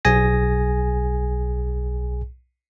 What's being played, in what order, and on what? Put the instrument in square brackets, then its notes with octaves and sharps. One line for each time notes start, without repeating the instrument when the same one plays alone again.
[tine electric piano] B1 G#4 G#5 A#6